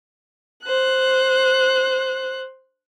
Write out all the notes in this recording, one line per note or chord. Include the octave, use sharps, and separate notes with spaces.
C5 F#6